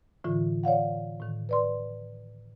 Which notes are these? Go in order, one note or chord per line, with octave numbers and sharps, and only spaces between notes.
A2 D3 E3 F4
C#5 D5 F5 F#5
A2 D#3
B4 D5 C6